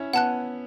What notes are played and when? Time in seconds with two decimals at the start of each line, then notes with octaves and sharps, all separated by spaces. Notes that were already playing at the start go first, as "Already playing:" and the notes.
Already playing: C#4 E4
0.13 B3 F#5 A5 F#6